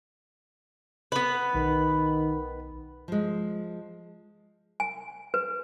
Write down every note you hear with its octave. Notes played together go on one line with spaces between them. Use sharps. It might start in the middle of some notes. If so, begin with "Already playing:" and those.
B3 B4
B1 D#3
F3 G#3
G#5
B4